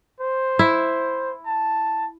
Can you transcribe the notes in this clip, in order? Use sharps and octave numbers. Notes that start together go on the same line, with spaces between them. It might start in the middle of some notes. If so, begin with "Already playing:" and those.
C5
E4
A5